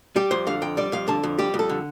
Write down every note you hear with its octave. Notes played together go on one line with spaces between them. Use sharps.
G3 G4
F2 C5
D3 F5
F2 G5
G3 D5
F2 F5
D3 A5
F2
G3 G4
F2
A4
D3